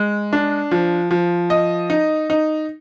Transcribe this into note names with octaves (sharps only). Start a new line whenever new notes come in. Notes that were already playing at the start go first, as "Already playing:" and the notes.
Already playing: G#3
D4
F3
F3
D#5
D#4
D#4